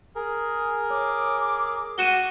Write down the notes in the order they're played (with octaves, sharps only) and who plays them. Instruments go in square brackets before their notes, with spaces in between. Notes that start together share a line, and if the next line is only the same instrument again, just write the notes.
[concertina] G#4 A#4
[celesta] C#5 [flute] D6
[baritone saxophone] F#4 [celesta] D#7 E7 G7